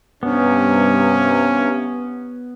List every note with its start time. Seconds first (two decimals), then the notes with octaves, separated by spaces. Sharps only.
0.23 G2 C3 B3 C#4